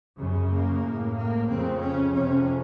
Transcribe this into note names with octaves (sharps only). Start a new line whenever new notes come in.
F#2 C#3
A#3
A2
A#3
F2 C#3 C4
C#4
F2 C3 C#4